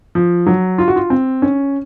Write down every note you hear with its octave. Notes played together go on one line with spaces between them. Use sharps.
F3
F#3
F4
F#4
F4
C4
C#4